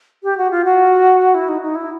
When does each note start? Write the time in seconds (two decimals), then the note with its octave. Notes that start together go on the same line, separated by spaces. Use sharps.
0.23 G4
0.38 F#4
0.51 F4
0.65 F#4
1.34 E4
1.48 D#4
1.62 D#4
1.75 E4